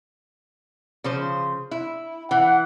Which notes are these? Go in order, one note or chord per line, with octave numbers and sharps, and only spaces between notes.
C#3 F3 C5
E4
E3 F#5